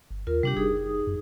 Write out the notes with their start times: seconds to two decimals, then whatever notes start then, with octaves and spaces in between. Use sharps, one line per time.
0.10 G1
0.27 D#2 F4 A#4
0.43 C3 G3 D4 G4
0.56 F#1 D#4 G#4 D#6
1.07 F#2